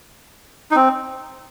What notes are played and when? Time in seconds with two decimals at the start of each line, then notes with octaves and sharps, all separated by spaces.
0.71 D#4
0.76 C4